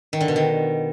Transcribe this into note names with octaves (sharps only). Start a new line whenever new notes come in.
D#3
D3
B2
D#3